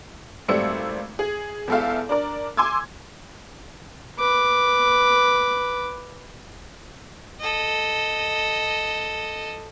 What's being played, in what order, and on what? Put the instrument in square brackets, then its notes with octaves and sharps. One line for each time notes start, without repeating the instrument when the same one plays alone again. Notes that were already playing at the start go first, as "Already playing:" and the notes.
[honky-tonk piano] G#1 G3 A3 C4 E6 C#7
G#4
E2 G#3 A4 E5 F5
D4 A#4 D5
G#5 C6 D6 E6 G#6
[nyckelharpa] B4 D6
[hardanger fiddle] A4 D#5